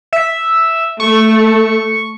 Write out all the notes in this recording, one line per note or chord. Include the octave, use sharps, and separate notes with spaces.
E5
A3 C#6